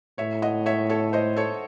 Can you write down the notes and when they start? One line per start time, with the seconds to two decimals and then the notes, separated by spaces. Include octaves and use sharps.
0.18 A2 C#5 E5
0.42 D#5 F#5
0.66 C#5 E5
0.89 A4 C#5
1.13 C5 D#5
1.36 A4 C#5